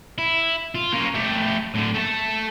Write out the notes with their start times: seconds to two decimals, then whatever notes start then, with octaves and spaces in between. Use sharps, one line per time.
0.18 E4
0.75 F4
0.92 A#3 C#4
1.14 A3 G4
1.74 A2 D3
1.94 A3 A5